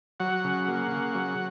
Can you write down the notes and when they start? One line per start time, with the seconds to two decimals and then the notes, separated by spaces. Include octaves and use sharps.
0.20 F#3 F#5
0.44 C#3
0.68 A#3
0.91 C#3
1.15 F#3